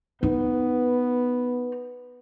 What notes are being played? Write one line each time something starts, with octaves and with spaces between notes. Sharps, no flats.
B3 D#4